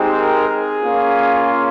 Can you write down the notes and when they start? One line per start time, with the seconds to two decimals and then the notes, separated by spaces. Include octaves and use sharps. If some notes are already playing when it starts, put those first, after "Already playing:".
Already playing: G#3 C4 D#4 G4
0.14 A#4
0.48 G#4
0.81 A#3 C#4 F4